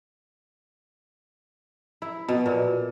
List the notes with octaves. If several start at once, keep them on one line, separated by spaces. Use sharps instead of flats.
E4
B2
A#2